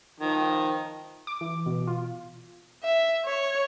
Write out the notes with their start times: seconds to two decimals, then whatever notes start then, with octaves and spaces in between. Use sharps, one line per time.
0.20 D#3 F3
1.27 D6
1.41 E3
1.66 B2
1.87 F4
2.83 E5
3.25 C#5